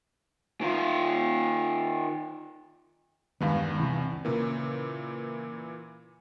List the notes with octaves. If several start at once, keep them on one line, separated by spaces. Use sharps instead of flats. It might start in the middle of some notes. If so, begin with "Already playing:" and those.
D#3 F4
E2 G2 D#3 G#3 B3 F5
C#2 C3 E3
A#2 C#3 E3 A#3